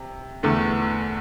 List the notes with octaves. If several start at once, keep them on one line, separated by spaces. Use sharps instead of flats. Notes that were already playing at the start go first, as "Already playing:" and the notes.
Already playing: C3
E2 D3 A3